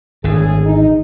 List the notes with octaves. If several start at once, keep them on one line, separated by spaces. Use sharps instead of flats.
G#1 E2 A2 D3 G#4
D#4